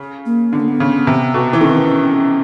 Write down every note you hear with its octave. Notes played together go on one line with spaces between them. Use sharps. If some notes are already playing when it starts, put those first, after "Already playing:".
Already playing: C#3
A#3
D3 B3
A#3
B3
C#3
C3
B2
E3
D#3 C#4
C4
C#4